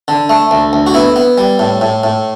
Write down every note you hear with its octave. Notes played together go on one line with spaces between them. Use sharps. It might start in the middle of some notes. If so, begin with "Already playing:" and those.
D3
A3
D2
D2
F#4
B3 E4
B3
G3
A2
A2
A2